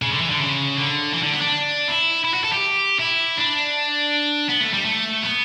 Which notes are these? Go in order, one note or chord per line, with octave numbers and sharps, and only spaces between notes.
C#3
D3
E3
D3
C#3
D3
E3
D3
B3
D4
E4
E4
F#4
A4
G4
E4
D4
B3
A3
G3
A3
B3